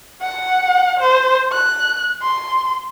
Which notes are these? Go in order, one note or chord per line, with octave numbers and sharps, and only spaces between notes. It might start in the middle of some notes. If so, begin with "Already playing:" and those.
F#5
C5
F#6
C6